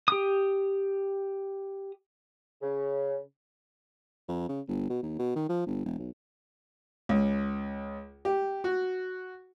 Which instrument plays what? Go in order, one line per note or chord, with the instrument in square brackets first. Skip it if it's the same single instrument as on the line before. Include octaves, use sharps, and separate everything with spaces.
[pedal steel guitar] G4 D#6
[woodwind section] C#3
[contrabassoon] F2
C#3
G1
B2
D#2
B2
D#3
F3
G1
E1
B1
[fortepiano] C#2
G4
F#4